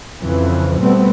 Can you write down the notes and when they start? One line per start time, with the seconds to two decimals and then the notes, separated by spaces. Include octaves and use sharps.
0.21 F2 C#3 E3
0.81 B2 G3 A3 B3 C4